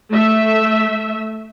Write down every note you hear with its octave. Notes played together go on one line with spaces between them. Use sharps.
A3 E5